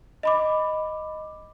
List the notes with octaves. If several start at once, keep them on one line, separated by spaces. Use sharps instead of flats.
D#5 B5 D6